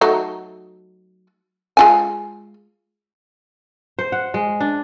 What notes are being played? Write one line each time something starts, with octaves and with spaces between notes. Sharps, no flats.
F#3 A3 D#4
G#3 F4 G#5
C5
F#5
G#3
D4